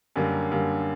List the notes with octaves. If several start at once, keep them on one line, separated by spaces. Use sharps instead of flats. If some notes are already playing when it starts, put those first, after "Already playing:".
F#2 D3 G3 A#3
F#2 D3 G3 A#3